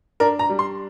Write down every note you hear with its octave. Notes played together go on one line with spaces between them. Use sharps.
D4 A#4
A#5
G3
C6